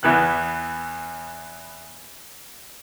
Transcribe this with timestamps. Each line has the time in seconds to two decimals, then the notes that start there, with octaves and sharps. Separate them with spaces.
0.03 E2 E3 B3 F#6